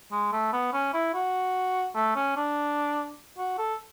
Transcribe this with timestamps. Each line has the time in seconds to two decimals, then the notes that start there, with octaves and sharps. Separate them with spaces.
0.12 G#3
0.32 A3
0.53 B3
0.73 C#4
0.94 E4
1.14 F#4
1.95 A3
2.16 C#4
2.36 D4
3.38 F#4
3.58 A4